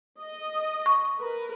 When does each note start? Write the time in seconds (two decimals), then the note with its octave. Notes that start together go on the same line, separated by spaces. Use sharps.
0.20 D#5
0.86 C#6
1.18 A#4 B4